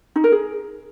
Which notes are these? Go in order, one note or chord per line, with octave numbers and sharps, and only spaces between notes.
D#4
A#4
G#4